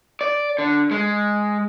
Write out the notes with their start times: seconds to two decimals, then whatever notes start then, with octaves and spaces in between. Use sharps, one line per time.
0.21 D5
0.58 D3
0.91 G#3